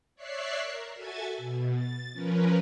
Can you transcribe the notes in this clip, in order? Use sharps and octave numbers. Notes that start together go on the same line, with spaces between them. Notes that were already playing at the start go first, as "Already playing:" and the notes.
C#5 D5 E5 C#6 F#6 C7
A#4
F#4 A4 E5 G#5 G#6 A6
B2
A6
F3 C#4 A#4 B4